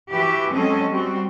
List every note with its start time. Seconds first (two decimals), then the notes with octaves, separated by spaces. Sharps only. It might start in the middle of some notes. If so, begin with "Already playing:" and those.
0.11 E3 F#4 G4 B4 E5
0.53 F#3 G#3 C4 C#4 A4 D#5
0.90 G3 C4 F#4